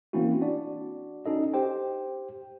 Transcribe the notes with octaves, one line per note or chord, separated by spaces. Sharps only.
E3 A#3 C4 C#4 E4 F#4
D4 F#4 D5
C#4 D#4 A4 D#5
G4 C5 G5